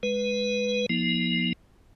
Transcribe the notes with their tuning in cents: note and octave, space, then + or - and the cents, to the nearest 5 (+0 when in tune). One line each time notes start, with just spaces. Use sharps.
G#3 +0 B4 +0
F3 +0 A#3 +45 D#4 +40